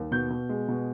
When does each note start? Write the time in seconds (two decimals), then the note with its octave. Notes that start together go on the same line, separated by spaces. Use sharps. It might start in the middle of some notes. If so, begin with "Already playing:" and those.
Already playing: D#2
0.11 B2 G6
0.30 B2
0.49 G#3
0.68 B2